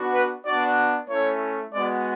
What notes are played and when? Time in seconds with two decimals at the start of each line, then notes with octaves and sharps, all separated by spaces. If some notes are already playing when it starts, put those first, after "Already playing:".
Already playing: B3 D4 F#4
0.13 B4
0.45 B3 D4 F#4 D5
1.09 A3 C#4 E4 C#5
1.73 G#3 B3 F#4 D5